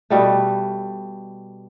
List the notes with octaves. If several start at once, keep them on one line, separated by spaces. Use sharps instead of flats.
B2 G3 A3